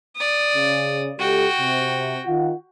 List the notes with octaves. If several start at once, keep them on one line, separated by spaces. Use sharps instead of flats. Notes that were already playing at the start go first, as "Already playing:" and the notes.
D5 D#6
C#3
C#2 F#4 G4 A4 G5
C3
D#3 F4 F#5